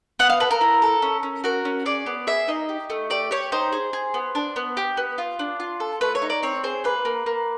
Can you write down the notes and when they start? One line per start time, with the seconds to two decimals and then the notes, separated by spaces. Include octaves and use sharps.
0.19 B3 F#5
0.30 F5
0.40 A4 B4
0.51 A#4
0.61 E4
0.82 A4
1.02 C#4
1.23 C#4
1.44 F#4 A#4
1.65 C#4
1.86 G#4 D5
2.06 B3
2.27 G#4 E5
2.48 D#4 D#5
2.69 G4
2.90 A3
3.10 G4 D5
3.31 G4 C#5
3.52 D#4 C5
3.72 G#4
3.93 G#4
4.14 B3
4.35 D4
4.56 B3
4.77 G4
4.97 B3
5.18 F4
5.39 D4
5.60 F4
5.80 A4
6.01 A3 B4
6.15 C#5
6.22 D#4
6.30 D5
6.43 C4 C#5
6.63 G#4 C5
6.84 A#3 B4
7.05 A#3
7.26 A#3